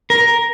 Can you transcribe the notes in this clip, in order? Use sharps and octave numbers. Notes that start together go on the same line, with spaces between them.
A#4